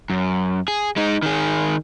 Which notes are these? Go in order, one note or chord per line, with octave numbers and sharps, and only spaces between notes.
F#2
G#4
G#3 D#4
D#3 G#4